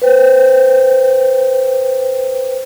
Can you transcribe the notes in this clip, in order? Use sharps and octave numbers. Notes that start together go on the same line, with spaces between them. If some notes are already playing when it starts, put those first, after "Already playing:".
B4 C5 G5